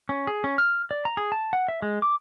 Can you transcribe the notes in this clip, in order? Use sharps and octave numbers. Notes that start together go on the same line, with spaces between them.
C#4
G#4
C#4
F6
D5
A#5
G#4
A5
F#5
E5
G#3
D6